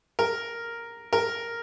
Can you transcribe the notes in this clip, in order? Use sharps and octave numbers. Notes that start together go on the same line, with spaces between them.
A#4
A#4